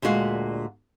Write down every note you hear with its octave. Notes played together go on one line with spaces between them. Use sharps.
D2 A#2 G#3 F#4 F5